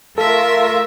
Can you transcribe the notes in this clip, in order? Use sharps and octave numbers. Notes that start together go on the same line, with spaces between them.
A3 F4 A4 A#4 E5